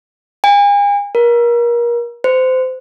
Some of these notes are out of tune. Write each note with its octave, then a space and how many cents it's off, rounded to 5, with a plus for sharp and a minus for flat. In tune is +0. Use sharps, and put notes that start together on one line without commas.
G#5 -40
A#4 +30
C5 -25